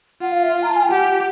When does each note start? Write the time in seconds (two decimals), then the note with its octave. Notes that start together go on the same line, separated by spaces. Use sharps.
0.21 F4 F#5
0.32 F5
0.43 E5
0.54 F5
0.62 A#5
0.69 A5
0.76 G#5
0.83 G5
0.91 G4 F#5